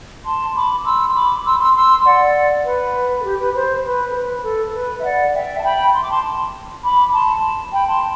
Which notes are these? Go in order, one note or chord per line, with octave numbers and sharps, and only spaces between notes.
A5 C6
B5 D6
C6 E6
C6
B5 D6
C6 E6
C6 E6
C6 E6
D5 F#5
B4
A4
G4
B4
C5
B4
A4
B4
A4
A4
B4
E5
D5 F#5
E5 G5
A5
G5 B5
C6
D6
A5 C6
B5 D6
A5 C6
G5 B5
A5 C6